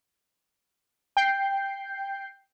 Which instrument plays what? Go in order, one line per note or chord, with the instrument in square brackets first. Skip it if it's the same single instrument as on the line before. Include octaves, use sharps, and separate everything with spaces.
[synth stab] G5 G6 C7